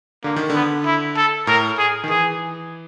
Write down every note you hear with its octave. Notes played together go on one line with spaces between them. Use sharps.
D3 A#3
D#3
D3 B3
E4
A4
A2 A#4
G#4
D#3
E3 G#4